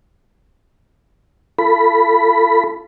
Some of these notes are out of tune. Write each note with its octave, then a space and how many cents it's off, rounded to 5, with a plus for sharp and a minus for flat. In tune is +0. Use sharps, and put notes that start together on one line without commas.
F4 -35 A4 +15 B5 +0